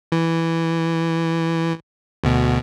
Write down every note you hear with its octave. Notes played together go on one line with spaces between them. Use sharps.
E3
D2 B2